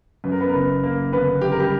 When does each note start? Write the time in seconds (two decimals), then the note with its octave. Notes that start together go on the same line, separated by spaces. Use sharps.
0.24 F#2 B4
0.32 A#4
0.40 B3 B4
0.48 A#4
0.54 F#1 B3 B4
0.83 F#1 A#3 A#4
1.12 D3 B3 B4
1.41 F#2 G4
1.51 A#4
1.60 G3 G4